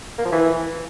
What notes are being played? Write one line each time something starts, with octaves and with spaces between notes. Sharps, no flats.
A#3
F3
E3